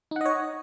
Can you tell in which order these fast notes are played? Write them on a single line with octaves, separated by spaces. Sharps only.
D#4 F#5 D#5 C#5